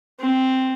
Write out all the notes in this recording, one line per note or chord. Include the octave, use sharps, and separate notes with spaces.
C4